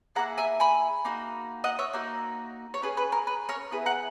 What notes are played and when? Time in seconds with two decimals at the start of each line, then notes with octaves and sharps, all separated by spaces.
0.15 A#3 E4 G#4 F#5 A#5
0.38 E5 G#5
0.60 G#5 B5
1.05 A#3 D#4 F#4
1.64 D#5 F#5
1.79 C#5 E5
1.93 A#3 D#4 F#4
2.74 C#5
2.82 C#4 G#4 B4
2.97 B4
3.12 A#4
3.27 B4
3.49 A#4 C#5
3.71 B3 E4 G#4 B4
3.86 F#5 A#5